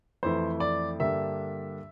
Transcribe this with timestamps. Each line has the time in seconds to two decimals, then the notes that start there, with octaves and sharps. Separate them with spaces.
0.23 F2 E3 A3 E4 C5
0.60 D5
0.99 G2 D3 G3 A#3 E5